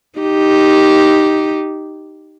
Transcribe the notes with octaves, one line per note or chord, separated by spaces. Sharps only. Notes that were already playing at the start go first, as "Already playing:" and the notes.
D#4 G4